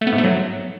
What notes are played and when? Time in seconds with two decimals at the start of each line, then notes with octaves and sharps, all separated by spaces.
0.01 A3
0.07 B3
0.13 G#2
0.18 A3
0.24 F#3